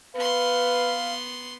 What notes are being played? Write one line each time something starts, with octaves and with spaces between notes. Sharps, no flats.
B3 B4 F5 C6